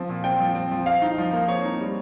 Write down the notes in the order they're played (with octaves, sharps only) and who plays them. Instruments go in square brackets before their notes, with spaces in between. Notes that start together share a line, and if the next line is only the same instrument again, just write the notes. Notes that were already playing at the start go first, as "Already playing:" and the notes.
Already playing: [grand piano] F3 C4
A#2
C4 G5
F3
C4
F3
C4 F5
D#4
F3
A#3
C4 C#5
D#4
G3